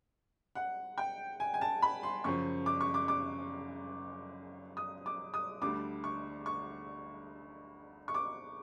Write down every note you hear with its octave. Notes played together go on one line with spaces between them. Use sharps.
F#5
G5
G#5
G#5
A5
B5
C6
F#2 C#3 F3 C#6
D6
C#6
D6
D6
D#6
D6
D#6
D2 D3 G3 D6
C#6
C#6
C#6
D6